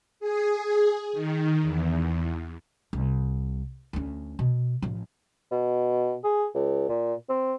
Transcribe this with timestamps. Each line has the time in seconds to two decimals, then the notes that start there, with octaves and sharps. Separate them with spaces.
0.20 G#4
1.13 D#3
1.62 E2
2.93 C2
3.93 D2 C#4
4.39 B2
4.82 A1 F3
5.51 B2
6.24 G#4
6.55 C#2
6.89 A#2
7.29 C4